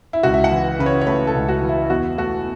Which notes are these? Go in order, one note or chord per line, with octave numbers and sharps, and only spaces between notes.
E4
C#2 F#4
E5
F#5
E3
C#3 B4
C#5
C#5
A3 B4
A4
C#2
F#4
E3
E4
E2 F#4
A3 F#4